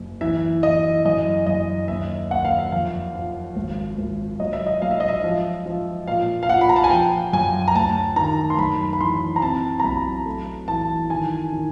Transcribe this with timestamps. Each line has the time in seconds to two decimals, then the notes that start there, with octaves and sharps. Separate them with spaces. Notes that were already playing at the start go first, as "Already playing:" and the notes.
Already playing: F#1
0.21 E3 E5
0.63 E3 D#5
1.05 F#2 D#5
1.46 F#2 D#5
1.88 D#2 E5
2.30 D#2 F#5
2.45 F5
2.59 E5
2.72 F2 F5
3.15 F3
3.56 G#1
3.97 G#1
4.40 F#3 D#5
4.53 E5
4.66 D#5
4.82 F#3 F5
4.91 E5
5.00 D#5
5.08 E5
5.24 F3
5.66 F3
6.07 A#2 F5
6.43 F5
6.49 A#2 F#5
6.61 B5
6.69 A#5
6.76 A5
6.84 G#5
6.91 F3 G5
7.33 F#2 G#5
7.68 A#5
7.74 D2 A5
8.16 D#3 A#5
8.50 C6
8.59 F#2 B5
8.93 B5
9.01 E3 C6
9.36 A#5
9.42 C4 A5
9.80 A#5
9.84 B1 B5
10.26 A3
10.68 E3 A5
11.10 D#3 G#5
11.52 D#3